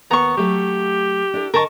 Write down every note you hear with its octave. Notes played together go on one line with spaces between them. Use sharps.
D#2 B3 A#5 C#6
F#3 A3 G4 A4
D4 E4 A4
D3 A#4 D#5 A5 C#6